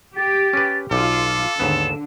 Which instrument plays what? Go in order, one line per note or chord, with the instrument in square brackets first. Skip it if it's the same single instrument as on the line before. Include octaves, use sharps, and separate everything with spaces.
[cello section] G4 [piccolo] A6
[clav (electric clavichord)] C#4 B4
[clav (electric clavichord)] B1 [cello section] F4 [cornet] A4 [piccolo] D6
[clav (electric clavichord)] D#2 G#2 B3 [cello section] D3 [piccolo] E7